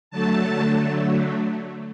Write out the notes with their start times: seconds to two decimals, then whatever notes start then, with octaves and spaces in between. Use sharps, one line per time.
0.11 D3 F#3 A3 A5